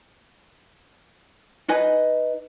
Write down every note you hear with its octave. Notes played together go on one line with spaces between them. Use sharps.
D#4 B4 D#5 G#5